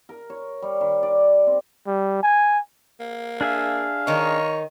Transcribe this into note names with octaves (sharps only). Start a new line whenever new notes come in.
A#4
C#5
G3
D#3
D5
C4
G3
G#5
A#3
D4 G#4 E5 F5
D#3 D#4 C#5